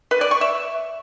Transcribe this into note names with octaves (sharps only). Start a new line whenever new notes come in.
B4
D5
C#6
E5